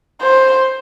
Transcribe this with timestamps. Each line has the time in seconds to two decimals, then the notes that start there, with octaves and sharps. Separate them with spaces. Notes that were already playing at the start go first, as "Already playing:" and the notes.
0.22 C5